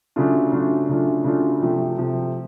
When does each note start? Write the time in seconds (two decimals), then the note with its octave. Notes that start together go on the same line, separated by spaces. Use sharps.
0.16 C#3 F#3 A3 D4 F4
0.52 C#3 F#3 A3 D4 F4
0.89 C#3 F#3 A3 D4 F4
1.24 C#3 F#3 A3 D4 F4
1.62 C3 F3 A3
1.98 C3 F3 A3